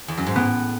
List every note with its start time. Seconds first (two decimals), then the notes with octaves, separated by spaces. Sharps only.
0.08 E2
0.17 F#2
0.26 G#2
0.36 A2 B3